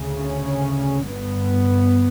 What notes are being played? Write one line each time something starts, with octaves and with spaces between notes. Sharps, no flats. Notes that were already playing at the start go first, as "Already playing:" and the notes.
Already playing: D2 C#3
C#4
G1 G2 B3